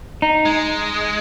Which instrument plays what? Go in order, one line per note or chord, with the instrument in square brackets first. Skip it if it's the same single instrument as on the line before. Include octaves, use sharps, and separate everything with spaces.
[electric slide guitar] D#4
[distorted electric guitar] G#3